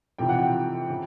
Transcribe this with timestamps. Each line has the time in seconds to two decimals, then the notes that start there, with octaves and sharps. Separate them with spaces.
0.18 F2 C3 E3 G5
0.29 F#5
0.39 G5
0.90 C#3